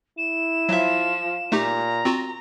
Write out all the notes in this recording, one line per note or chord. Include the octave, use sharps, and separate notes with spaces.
E4 E7
F3 F#3 E5
A#2 A3 D#4 G4 A#5
C4 F4 F#4